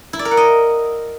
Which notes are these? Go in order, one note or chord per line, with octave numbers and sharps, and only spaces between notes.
E4
D5
A#4
F#5
D#5